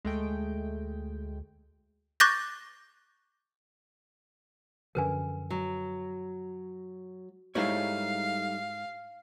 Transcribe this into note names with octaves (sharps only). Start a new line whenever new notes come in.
D2 G#3 A3 G5
C#6 D6 F#6 G6 A6 A#6
F#2 D3 F3 A#4 B4 G#5
F#3
G#2 G3 A3 D#4 E4 C#5 F5